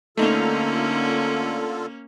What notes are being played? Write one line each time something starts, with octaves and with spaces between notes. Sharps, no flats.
D3 A3 A#3 C#4 D#4 F4 A4